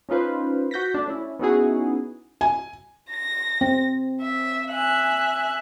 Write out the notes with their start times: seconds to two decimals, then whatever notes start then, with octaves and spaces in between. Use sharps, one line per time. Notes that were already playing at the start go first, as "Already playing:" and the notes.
0.09 C#4 D#4 F4 B4 C5
0.71 F#4 G6 A#6 B6
0.94 A3 D4
1.07 C#4 E4
1.39 B3 C#4 D#4 E4 F#4 G#4
2.41 G#5
3.10 A#6
3.61 C4
4.22 E5
4.70 E5 G#5 F#6